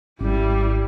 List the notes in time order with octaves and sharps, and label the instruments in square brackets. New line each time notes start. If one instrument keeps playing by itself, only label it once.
[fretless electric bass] G#1 C#4 [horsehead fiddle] G3 E4